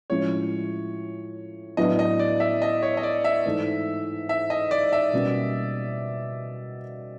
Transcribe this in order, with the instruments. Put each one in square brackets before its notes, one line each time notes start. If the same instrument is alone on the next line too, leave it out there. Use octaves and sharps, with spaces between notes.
[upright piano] A2 F3 G#3 C#4 [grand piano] C#5
[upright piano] A2 F#3 B3 D4 [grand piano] D#5
[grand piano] D#5
D5
E5
D#5
C#5
D#5
D5
E5
[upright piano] G#2 E3 A3
[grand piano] E5
D#5
D5
E5
[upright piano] B2 G3 A#3 C#4 F#4